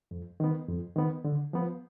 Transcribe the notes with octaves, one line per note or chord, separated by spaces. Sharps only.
F2
D#3 B3
F2
D#3 B3
D3
F3 B3